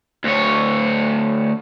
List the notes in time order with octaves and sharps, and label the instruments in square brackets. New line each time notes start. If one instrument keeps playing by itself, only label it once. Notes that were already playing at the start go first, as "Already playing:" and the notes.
[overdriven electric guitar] D2 C#5